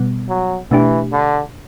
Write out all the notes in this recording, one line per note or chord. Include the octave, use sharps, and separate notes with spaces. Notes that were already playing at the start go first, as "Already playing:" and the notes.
Already playing: B2 G3 B3
F#3
B2 E3 A3 D4 G4
D3